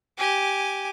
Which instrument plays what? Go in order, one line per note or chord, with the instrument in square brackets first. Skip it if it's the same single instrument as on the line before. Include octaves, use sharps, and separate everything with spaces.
[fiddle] G4 G#5